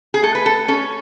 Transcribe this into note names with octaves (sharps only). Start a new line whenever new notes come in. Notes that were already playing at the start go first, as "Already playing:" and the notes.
G#4
A3 A4
B4
A4
C#4 A4